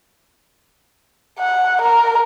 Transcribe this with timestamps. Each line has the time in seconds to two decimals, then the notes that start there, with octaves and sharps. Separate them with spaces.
1.39 F#5
1.82 A#4